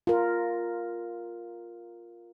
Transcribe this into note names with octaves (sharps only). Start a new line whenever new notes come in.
F4 A#4